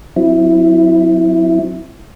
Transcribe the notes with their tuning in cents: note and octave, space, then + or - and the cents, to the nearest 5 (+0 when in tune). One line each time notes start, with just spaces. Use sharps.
F#3 -25 C4 +0 E4 +0